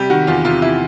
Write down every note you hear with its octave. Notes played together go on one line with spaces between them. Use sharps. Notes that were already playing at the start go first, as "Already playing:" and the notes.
Already playing: C3 G3 G4
D#3 F#4
E2 F4
C3 F4
E4